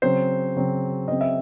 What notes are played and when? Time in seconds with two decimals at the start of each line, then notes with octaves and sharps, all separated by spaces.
0.02 C#3 F#3 C4 C5
0.56 C#3 F#3 C4
1.08 C#3 F#3 C4 D#5
1.21 E5